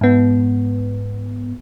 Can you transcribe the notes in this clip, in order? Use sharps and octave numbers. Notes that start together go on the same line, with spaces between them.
G#2 B3